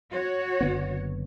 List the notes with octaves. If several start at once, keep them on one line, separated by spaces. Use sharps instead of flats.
F#4 C#5
F#1 D3 B3